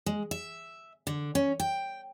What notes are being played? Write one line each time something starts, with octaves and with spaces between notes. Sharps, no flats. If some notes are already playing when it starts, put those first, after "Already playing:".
G#3
E5
D3
C#4
G5